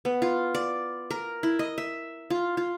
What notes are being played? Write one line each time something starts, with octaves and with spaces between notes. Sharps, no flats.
B3
F4
D5
A#4
E4
D#5
E5
F4
F4